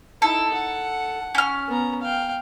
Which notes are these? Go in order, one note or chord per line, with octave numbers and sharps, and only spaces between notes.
D#4 E4 A4
F#5
C#4 F6
B3 A#5
F5 G5